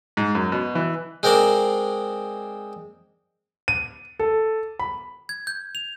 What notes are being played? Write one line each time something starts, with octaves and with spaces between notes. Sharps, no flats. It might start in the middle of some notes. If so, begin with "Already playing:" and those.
G#2
F#2
B2
E3
G#3 C4 A#4 C5 D5
D#7
A4
B5
G#6
G6
F7